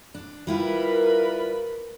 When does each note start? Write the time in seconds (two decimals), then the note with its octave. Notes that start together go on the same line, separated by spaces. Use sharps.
0.14 D4
0.47 G3 E4 F4 A#4 B4 B5